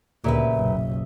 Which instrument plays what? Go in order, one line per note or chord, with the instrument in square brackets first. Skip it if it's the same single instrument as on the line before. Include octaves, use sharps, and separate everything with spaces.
[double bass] D2 C#3 [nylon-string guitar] A#2 G4 B4 [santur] D#5 E5
[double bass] F#1 B1